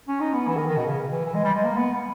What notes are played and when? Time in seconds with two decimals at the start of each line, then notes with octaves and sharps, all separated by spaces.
0.08 C#4
0.20 D#4
0.33 B3
0.47 E3
0.56 D#3
0.67 D#3
0.76 B2
0.86 C#3
1.12 E3
1.25 E3
1.34 G#3
1.44 G3
1.54 G#3
1.64 A#3
1.77 B3